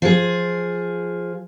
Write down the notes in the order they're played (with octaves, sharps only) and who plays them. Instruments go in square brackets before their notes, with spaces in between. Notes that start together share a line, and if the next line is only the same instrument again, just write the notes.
[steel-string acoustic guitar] F3 G#4